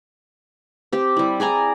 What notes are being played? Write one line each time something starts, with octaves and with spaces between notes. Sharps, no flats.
C4 G4
G3 E4
G#4 D5 G#5 A#5